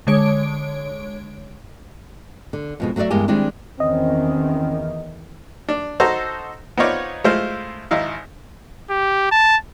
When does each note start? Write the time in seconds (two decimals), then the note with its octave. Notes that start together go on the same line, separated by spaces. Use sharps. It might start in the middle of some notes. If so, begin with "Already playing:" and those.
0.07 D3 G#3 C#5 D7
2.53 D3
2.80 F2 B2 G#3
2.96 F#3 A3 F#4 D5 E5
3.10 E2 G2 G#3 A#3 G4 G#5
3.28 D#3 G3 G#3 C4 D4 E4
3.80 E2 D#3 C4 C#4 D#5
5.69 D4
6.00 D#4 F#4 A4 C5 D#5 A#5
6.78 B3 C4 D#4 F4 C#5 D5
7.24 G#3 A3 E4 F4 C5
7.91 G#1 D#4 E4 F5
8.90 G4
9.31 A5